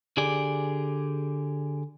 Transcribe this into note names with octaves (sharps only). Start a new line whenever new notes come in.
D3 G4 G#4 D5